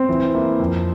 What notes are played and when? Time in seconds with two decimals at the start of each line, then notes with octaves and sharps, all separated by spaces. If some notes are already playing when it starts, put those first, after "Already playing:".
Already playing: C4
0.09 E3
0.34 A#3 E4
0.60 F2